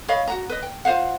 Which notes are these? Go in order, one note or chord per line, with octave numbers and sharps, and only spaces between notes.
C#5 D#5 F5 B5
F#4 F#5 A#5
B4 D#5
G5
F4 C5 F5 F#5